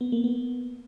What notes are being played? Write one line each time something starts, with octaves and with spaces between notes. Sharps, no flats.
B3
A#3
B3